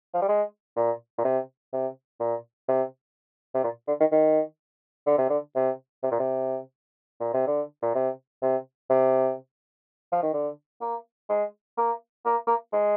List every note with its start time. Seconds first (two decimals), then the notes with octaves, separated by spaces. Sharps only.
0.14 F3
0.22 G3
0.28 G#3
0.76 A#2
1.18 A#2
1.25 C3
1.73 C3
2.20 A#2
2.68 C3
3.55 C3
3.64 A#2
3.88 D3
4.00 D#3
4.12 D#3
5.07 D3
5.18 C3
5.30 D3
5.56 C3
6.03 C3
6.12 A#2
6.20 C3
7.20 A#2
7.34 C3
7.47 D3
7.83 A#2
7.95 C3
8.42 C3
8.90 C3
10.12 F3
10.23 D#3
10.34 D3
10.81 A#3
11.29 G#3
11.78 A#3
12.25 A#3
12.47 A#3
12.73 G#3